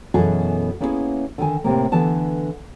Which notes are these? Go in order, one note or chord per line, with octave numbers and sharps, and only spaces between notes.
F#2 B2 E3 F#4 G#4 A4
A#3 B3 C#4 E4 F#4 G#4
D3 D#3 G#5
A2 C3 A#3
D3 E3 B3 A5